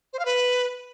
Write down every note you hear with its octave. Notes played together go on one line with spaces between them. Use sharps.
C5
F5
B4